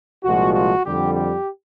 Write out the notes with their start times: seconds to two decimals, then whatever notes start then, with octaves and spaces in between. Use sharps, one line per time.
0.24 C2 A#2 F3 G#3 F#4
0.54 F#4
0.84 F2 D3 G3 G4
1.15 G4